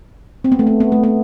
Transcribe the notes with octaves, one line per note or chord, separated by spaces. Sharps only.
C4
B3
A3
B3
B3
A3
B3